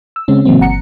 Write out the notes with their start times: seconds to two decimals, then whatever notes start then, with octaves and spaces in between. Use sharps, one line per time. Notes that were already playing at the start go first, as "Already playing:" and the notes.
0.16 E6
0.28 C#3 G#3 C4 C#4
0.45 A#2 C#3 E3 F#3 A#3 C4
0.61 G1 F#5 A#5 C#7